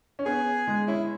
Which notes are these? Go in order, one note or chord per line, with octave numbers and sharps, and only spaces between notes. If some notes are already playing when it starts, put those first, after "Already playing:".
C#4
B3 G#4
G#3
C#4 E4